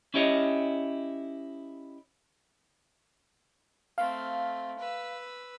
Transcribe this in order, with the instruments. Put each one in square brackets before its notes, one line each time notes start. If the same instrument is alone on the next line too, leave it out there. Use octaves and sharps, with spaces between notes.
[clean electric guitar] C#4 E4 G4 C#5 D#5
[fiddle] A3 C4 [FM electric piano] F5
[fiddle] B4 E6